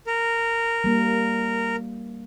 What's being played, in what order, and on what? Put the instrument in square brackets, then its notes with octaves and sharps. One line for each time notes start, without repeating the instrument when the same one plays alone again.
[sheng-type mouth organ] A#4
[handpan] G3 A#3